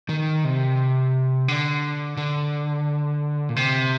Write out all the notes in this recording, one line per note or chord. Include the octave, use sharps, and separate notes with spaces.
D#3
C3
D3
D3
A#2
C3